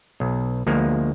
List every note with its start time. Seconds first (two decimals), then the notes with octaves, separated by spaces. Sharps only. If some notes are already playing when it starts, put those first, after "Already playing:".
0.20 B1
0.67 D2 F3 G#3 A#3